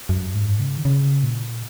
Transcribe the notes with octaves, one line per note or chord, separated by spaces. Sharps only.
F#2
G#2
C#3
D#3
C#3
A#2